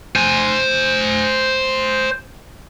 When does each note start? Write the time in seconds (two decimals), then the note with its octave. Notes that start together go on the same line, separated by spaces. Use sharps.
0.16 C5 G#5